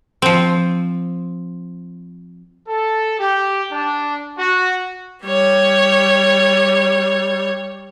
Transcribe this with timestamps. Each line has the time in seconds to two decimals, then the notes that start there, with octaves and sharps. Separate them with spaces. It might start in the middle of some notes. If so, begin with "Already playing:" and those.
0.22 F3 C4
2.69 A4
3.20 G4
3.72 D4
4.38 F#4
5.24 G3 C#5